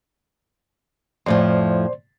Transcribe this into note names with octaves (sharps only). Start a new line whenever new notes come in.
F2 A2 F3 C5 D5 C6